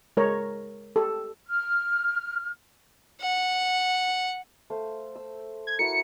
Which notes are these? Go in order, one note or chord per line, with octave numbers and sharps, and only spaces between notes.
G#3 A#4 C#5 A#5
G4 A4
F6
F#5
A3 C5 F5
E6
G#6
E4 F#4 A#4 C#7